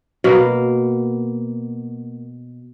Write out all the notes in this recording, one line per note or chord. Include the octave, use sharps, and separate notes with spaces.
B2 A#3